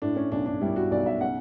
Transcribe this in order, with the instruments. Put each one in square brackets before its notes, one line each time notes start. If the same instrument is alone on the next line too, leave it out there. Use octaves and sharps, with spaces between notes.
[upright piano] A2 D4
C#4
B1 D4
D4
G3 E4
F#4
B1 D5
E5
C#3 F#5